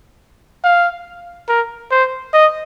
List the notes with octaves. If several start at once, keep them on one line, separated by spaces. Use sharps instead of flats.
F5
A#4
C5
D#5